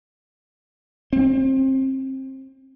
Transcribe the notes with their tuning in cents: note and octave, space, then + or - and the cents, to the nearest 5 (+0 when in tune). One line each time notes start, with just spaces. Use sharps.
C4 +25